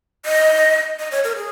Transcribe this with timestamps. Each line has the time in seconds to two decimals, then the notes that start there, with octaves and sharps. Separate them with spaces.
0.26 D#5
0.99 D#5
1.11 C#5
1.24 A#4
1.36 G#4